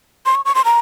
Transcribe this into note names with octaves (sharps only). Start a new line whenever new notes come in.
C6
C#6
C#6
C6
A#5